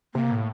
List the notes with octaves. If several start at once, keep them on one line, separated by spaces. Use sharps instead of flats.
C3 A#3
A2